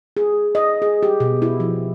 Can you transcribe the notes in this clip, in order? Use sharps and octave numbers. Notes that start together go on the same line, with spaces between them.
G#4
D#5
G#4
G4
B2
E4
F3